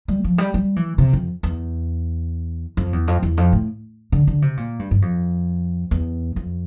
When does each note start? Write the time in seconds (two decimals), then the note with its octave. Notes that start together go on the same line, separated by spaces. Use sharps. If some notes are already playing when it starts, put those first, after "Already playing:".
0.08 G3
0.24 F3
0.38 G3
0.54 G3
0.76 E3
0.98 C3
1.13 F2
1.43 E2
2.77 F2
2.93 E2
3.08 F2
3.23 E2
3.37 F2
3.53 A2
4.12 D3
4.27 D3
4.42 C3
4.57 A#2
4.79 G2
4.91 G2
5.02 F2
5.91 E2
6.36 F2